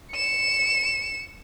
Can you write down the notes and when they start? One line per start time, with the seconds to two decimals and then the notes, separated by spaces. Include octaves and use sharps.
0.13 C#7 E7